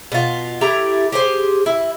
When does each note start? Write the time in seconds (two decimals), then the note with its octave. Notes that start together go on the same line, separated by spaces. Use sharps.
0.12 B2 F4
0.61 A3 E4 G4 A#5
1.12 G4 G#4 C5
1.66 E4